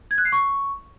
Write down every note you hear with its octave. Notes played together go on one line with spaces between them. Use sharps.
G#6
F#6
C7
C#6